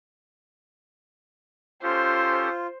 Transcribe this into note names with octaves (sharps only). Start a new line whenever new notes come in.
C#4 F4 G4 A4 C5